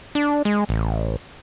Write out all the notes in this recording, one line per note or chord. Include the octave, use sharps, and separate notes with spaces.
D4
G#3
A1